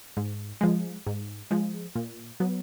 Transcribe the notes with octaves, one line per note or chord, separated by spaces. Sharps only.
G#2
F3 G#3
G#2
F3 G#3
A#2
F#3 B3